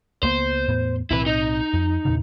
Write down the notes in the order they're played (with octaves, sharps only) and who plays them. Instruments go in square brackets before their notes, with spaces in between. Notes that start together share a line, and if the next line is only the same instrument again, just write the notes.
[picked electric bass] C#2 A#3 B3 [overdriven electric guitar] C5
[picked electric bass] E2 A2 B3
[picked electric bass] B1 A2 C4 [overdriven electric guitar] E4 B4
[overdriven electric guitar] D#4
[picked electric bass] F2
E2 A#2 C#3